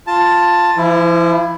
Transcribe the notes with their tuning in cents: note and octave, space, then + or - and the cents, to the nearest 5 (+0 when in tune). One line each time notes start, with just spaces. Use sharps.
F4 +0 A5 +5
F3 -35 E4 +5